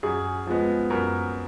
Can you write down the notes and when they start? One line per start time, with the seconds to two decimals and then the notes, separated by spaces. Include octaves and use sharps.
0.03 F#2 G#4
0.47 F3 G#3 B3
0.90 F#2 A#4